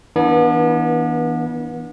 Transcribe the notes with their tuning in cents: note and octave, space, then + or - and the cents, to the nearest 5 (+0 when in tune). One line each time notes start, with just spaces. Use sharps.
E3 -25 B3 -35 D4 +0